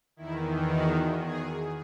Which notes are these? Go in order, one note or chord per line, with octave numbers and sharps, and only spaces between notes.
E2 D#3 E4
F#4
G#4